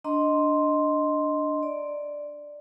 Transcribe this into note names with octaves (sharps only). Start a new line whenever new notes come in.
D4 D#5 A#5 C6
D5